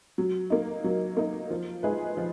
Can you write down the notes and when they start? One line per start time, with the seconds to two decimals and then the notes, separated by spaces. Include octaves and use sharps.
0.18 F#3
0.50 A#3 D#4
0.84 F#3
1.17 A#3 D#4
1.50 F3
1.83 G#3 D#4 G#4 B4
2.17 F3